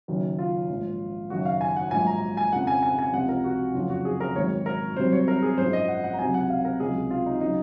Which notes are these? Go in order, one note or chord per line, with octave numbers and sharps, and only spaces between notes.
F#1 F#2 D#3 F#3
F4
A#1 G#2 F3
F#1 F#2 D#3 F#3 F#4
F5
G#5
F#5
A#1 G#2 F#3 G#5
A#5
G#5
F2 C#3 F3 F#5
G#5
G#5
G#5
C#2 C3 F3 F#5
A#4
F#4
F#1 F2 C#3 F3 F4
F#4
G#4
A#4
G#1 G#2 D#3 F#3 C#5
A#4
C2 C3 F#3 C5
C#5
A#4
G#4
G#1 F#2 F3 C5
D#5
F#5
F#5
A#5
C#2 C3 F#3 G#5
F#5
F5
A#4
C#2 C3 F#3 G#4
F4
D#4
C#3 F#3 D#4